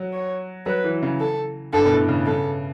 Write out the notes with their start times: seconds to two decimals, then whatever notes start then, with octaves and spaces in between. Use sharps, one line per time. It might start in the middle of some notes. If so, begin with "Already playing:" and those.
Already playing: F#3
0.13 C#5
0.66 F#3 B4
0.84 E3
1.03 C#3
1.20 A4
1.73 G2 A4
1.86 B2
1.92 A2
2.08 C#3
2.26 C#3 A4